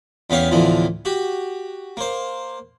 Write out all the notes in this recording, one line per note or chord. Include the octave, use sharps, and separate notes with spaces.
E2 B3 C#4 G4 F5 C#6
D2 A2 D3 E3 F3 B3
F#4 G4
A#3 C5